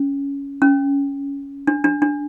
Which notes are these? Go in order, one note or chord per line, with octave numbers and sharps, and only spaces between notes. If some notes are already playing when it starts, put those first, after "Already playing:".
Already playing: C#4
C#4
D4
D4
D4